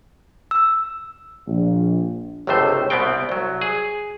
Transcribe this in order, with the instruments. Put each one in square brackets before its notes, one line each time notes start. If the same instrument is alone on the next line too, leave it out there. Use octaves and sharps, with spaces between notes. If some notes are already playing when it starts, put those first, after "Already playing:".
[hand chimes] E6
[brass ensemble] A#1
[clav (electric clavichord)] G1 C#2 A2 C3 A3 C5
C2 B2 B3 C4 G5
C2 F#3
G#4